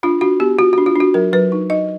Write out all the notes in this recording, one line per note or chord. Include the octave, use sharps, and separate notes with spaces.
D4 F4
D4 F#4
B3 G4
F4 F#4
D4 F#4
F4
D4 F#4
F#3 A#4
F#3 B4
D#4
D#4 D#5